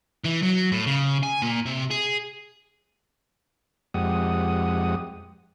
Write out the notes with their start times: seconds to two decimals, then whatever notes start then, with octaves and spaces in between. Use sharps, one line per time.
0.24 E3
0.42 F#3
0.72 A2
0.86 C#3
1.23 G#5
1.42 A#2
1.66 C3
1.91 G#4
3.94 F2 G#3 G4 F#5 D#6